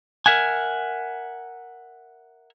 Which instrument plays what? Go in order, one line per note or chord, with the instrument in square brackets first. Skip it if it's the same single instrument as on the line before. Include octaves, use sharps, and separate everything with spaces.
[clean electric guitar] A#4 E5 F#5 G#5